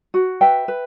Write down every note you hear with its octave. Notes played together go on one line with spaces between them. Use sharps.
F#4
B4 E5 G5
B4